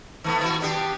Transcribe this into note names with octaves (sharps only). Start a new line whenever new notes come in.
D#3 A3 B3
D#3 F#4
B3 D4 G4